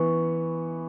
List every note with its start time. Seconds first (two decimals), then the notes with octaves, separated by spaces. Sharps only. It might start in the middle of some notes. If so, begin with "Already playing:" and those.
Already playing: E3 B3 C#6